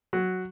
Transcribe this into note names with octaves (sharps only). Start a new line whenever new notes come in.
F#3